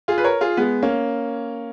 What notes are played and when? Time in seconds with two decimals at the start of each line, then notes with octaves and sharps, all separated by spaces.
0.08 F4 G#4
0.18 B4
0.24 A#4 C#5
0.41 F4 G#4
0.57 G#3 B3
0.82 A#3 C#4